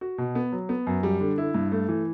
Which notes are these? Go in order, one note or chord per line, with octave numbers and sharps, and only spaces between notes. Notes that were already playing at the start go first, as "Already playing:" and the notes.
F#4
B2
B3
F#3
B3
F#2
G3
D3
E4
G2
A3
E3